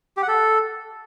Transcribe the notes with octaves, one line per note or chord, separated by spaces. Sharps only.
G4
F#5
A4